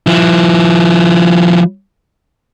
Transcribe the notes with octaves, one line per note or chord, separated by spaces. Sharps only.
F3 E4